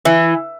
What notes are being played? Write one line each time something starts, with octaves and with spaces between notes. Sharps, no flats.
E3